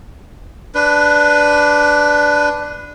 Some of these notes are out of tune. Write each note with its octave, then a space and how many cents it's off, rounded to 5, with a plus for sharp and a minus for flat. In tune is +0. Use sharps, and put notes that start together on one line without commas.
D4 +0 B4 +10